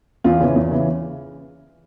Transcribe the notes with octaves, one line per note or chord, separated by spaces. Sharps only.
E2 F4
C#3 E3
E2
C#3 E3